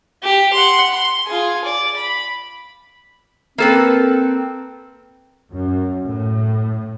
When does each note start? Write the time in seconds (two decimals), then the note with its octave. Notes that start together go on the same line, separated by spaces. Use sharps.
0.23 G4
0.53 F#5 C6
0.91 C6
1.27 F4 G#4
1.64 D5
1.97 B5
3.58 A#3 C4 A4 B4
5.52 F#2
6.06 A2